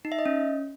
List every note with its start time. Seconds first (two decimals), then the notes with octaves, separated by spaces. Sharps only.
0.05 D#4
0.12 E5
0.19 D#5
0.26 C#4